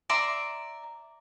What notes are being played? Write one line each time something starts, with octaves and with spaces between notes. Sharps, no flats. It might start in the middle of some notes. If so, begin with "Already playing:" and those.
D5 E5 A#5 C6